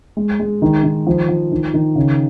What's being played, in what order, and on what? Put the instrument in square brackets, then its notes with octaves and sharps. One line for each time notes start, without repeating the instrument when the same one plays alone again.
[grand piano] G#3
G#3
D#3
D#3
F3
F3
D#3
D#3
C#3